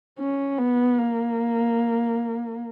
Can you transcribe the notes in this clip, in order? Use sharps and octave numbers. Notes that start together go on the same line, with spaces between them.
C#4
B3
A#3